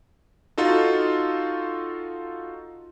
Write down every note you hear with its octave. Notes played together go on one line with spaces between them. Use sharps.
D#4 F4 F#4 A4